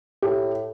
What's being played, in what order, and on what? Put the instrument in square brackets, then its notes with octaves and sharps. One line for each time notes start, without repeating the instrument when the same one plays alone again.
[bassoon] A2 [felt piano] G4